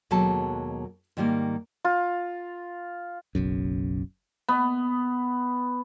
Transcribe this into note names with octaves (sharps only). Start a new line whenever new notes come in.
D#2 B2 F#3 G#3 A4 A5
G#2 D#3 G3 A3 A#3
F4
F#1 B1 F#2
B3